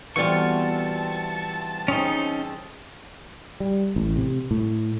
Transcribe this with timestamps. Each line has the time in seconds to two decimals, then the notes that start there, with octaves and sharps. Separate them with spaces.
0.16 B2 E3 G3 A3 C4 F4 A5 C#6
1.88 C4 C#4 D#4 G#4
3.60 G3
3.96 A1
4.16 C3
4.51 A2